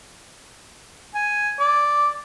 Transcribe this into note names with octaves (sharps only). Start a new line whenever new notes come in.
G#5
D5